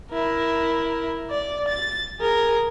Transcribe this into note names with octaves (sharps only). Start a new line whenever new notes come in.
E4 A#4
D5
A6
G#4 A#4